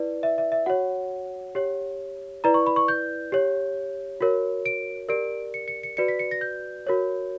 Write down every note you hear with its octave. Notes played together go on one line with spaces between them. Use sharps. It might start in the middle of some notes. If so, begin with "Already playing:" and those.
Already playing: E4 B4 D5
E5
E5
E5
F#4 C#5 F#5
G4 C#5
E4 B4 D5 A#5
C#6
B5
C#6
G6
G4 C#5
F#4 A#4 C#5
D7
G4 A#4 D5 D7
C#7
C#7
C#7
F#4 B4 D5 C#7
B6
C#7
A#6
G6
F#4 A#4 C#5